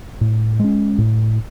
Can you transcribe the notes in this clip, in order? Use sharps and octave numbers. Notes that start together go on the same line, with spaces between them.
A2
G#3 C#4
A2